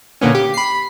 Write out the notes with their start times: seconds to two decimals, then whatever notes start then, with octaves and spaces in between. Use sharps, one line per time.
0.21 A#2 D3 A#3 B3 C#4
0.35 G4
0.54 B5 C7